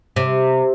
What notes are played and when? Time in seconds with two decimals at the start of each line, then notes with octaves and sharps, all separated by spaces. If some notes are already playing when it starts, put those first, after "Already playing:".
0.16 C3